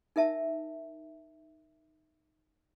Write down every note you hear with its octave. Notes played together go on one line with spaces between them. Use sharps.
D#4 A#4 E5 A5